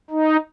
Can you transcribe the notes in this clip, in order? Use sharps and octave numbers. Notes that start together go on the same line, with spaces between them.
D#4